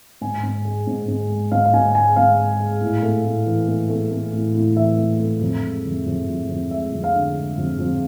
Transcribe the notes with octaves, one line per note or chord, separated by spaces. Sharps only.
G#2 G#5
G#2
G#3
G#2
G#2
G#3
G#2 F5
F5
G#2 G#5
G#3 G#5
G#2 F5
G#3
G#3
A2
A3
A2
E3
A3
A3
A3
A2
A2
E3 E5
A3
A3
F2
G#3
F2
F2
F2
F2
G#3 E5
F2
F5
D3
G#3
F2
F2